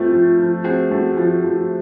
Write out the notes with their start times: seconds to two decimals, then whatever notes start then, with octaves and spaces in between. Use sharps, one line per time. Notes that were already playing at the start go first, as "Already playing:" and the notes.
Already playing: A3 C4 F4 G4
0.12 F3
0.38 F3
0.64 C4 F#4 G#4
0.91 A3
1.17 F3
1.44 F3